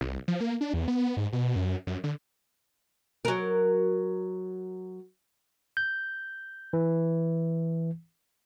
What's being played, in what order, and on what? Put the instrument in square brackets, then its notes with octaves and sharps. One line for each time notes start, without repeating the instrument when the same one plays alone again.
[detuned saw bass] C2
F3
A#3
D4
E2
B3
G#2
B2
F#2
F#2
D3
[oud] F#3 A#4
[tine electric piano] G6
E3